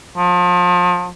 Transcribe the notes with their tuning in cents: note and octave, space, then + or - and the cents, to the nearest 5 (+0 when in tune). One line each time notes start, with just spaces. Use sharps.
F3 +35